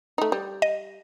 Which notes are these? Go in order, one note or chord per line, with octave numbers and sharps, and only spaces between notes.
A3 D#4
G3
D#5